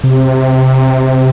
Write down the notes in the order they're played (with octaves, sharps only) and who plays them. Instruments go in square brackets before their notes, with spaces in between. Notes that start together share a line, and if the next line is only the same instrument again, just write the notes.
[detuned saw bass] C3